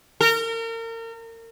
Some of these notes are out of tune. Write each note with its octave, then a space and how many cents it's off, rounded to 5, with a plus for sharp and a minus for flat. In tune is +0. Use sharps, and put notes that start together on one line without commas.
A#4 -35